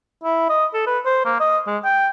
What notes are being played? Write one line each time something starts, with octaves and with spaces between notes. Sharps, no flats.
E4
D#5
A4
B4
C5
A#3
D#5
G#3
G5